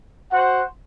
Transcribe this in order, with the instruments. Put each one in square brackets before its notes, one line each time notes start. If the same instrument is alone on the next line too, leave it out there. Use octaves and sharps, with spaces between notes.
[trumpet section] F#4 C5 F#5